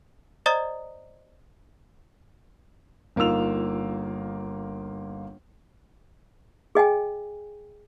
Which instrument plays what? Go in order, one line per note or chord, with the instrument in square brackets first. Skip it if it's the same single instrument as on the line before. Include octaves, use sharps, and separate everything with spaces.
[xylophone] C5 D5 D#5 A#5 D#6 A6
[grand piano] G1 A#3 D#4 F4 E6 F7
[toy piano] G#4 D#5 G5 G#5